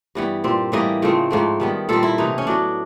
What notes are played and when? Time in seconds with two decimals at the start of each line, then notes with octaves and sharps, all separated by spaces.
0.15 G2 E3 G3 B3
0.44 A#2 G3 C4
0.72 A2 E3 G3 A#3 D#5
1.02 C#3 F3 A3 C4
1.31 G#2 F3 A3 C4
1.60 D#3 G3 B3
1.89 A#2 G3 C4 A4
2.03 E4
2.18 C3 E3 A3 D#4
2.38 C#4
2.47 A2 F#3 B3 D4